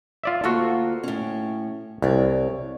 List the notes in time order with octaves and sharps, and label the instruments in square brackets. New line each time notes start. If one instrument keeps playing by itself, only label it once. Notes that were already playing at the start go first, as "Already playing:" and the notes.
[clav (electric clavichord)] F4 D5 E5
[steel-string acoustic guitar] D2 A#3 F4 [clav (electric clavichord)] F#4 A4
[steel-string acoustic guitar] A2 C#4
[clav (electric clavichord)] C2 [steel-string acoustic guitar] C#5 D5